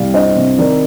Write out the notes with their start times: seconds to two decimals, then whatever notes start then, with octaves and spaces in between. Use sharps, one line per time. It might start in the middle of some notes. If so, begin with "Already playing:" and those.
Already playing: C2 G3 D5 F5
0.14 D4 C5 D#5
0.36 C3
0.58 D#3 A#4 D5